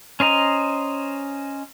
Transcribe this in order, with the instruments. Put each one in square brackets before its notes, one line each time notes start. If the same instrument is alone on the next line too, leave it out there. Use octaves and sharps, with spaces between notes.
[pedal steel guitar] C#4 C5 D#5 A#5